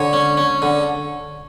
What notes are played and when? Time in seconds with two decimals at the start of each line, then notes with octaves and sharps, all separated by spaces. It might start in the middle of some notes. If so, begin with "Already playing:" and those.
Already playing: D3 C#5
0.13 C#4
0.37 C#4
0.62 D3